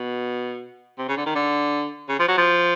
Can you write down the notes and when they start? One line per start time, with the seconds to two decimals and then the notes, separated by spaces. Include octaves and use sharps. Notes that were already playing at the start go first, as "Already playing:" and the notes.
Already playing: B2
0.98 C3
1.08 C#3
1.17 D3
1.26 D#3
1.35 D3
2.09 C#3
2.19 F3
2.28 F#3
2.38 F3